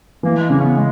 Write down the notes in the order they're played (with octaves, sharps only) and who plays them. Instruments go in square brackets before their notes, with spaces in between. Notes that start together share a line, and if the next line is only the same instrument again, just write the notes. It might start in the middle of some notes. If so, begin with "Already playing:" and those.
[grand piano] E3 [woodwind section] A#3
[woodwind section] G#3
[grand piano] C#3 [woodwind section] A#3
[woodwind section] C#4
B3
G#3